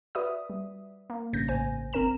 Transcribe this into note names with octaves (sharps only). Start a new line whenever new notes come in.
F#4 B4 D5 E5 D#6
G3
A#3
A1 G2 C#3 G6 A#6
A1 C5 G#5
G1 C4 A#4 A#5 E7